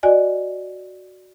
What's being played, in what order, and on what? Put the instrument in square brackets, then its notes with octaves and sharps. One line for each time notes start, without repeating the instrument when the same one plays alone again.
[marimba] F#4 D5 D#5 G#5